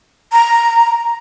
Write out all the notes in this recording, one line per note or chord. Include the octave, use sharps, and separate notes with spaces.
A#5